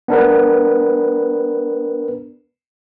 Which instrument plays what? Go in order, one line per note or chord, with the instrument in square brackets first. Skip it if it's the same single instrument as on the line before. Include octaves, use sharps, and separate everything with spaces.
[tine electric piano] B3 D4 A#4 B4